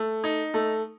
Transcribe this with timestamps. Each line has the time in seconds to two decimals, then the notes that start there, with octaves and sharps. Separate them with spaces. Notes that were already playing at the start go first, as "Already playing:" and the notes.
Already playing: A3
0.24 D#4
0.54 A3